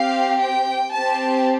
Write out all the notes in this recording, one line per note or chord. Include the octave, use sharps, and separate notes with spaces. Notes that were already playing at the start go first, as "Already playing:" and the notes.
Already playing: C4 G4 F5
G5
C4 G4 A5